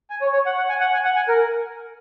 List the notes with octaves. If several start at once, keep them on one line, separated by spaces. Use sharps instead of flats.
G#5
C#5
C#5
F#5
F#5
G#5
F#5
G#5
F#5
G#5
A#4